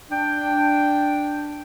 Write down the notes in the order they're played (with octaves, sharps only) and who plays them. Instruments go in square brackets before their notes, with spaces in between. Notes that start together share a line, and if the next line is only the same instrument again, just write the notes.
[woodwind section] D4 G5